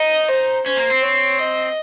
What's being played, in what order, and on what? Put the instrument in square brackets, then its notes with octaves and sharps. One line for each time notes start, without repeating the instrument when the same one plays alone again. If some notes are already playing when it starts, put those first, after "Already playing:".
Already playing: [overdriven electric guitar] D#4 [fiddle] D#5
[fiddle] C5
[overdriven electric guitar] C#4 [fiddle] C5
[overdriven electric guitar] A#3
C4
[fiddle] C#5
D#5